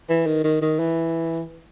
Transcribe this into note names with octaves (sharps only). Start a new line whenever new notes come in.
E3
D#3
D#3
D#3
E3